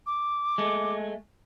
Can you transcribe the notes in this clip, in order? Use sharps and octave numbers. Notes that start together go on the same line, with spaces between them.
D6
G#3 A3